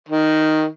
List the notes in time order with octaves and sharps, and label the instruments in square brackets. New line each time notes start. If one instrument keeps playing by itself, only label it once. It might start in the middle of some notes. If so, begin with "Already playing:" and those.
[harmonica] D#3